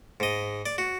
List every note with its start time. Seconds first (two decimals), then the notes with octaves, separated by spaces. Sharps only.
0.20 G#2 D#5
0.66 D5
0.78 F#4